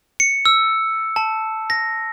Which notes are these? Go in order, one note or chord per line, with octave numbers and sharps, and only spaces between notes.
C#7
E6
A5
A#6